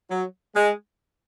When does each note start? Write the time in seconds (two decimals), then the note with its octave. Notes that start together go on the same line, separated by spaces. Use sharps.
0.10 F#3
0.55 G#3